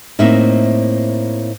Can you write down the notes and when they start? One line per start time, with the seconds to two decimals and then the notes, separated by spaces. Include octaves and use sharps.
0.19 A2 A#3 C4 D#4 E5